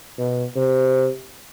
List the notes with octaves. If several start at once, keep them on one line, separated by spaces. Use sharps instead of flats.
B2
C3